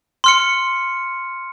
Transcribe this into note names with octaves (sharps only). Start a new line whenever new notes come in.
C6 F6 C#7